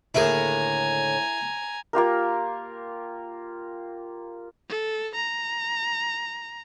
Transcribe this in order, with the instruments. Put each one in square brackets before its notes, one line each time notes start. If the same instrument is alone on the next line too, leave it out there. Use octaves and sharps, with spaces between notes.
[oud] D#2 A2 D3 [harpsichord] E4 G#4 A#4 [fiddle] G#5 A#5
[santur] A#3 F4 G4 A#4
[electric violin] A4
A#5